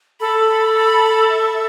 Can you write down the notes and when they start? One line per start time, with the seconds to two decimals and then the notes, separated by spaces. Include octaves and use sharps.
0.20 A4 B5
0.76 B5
1.30 E5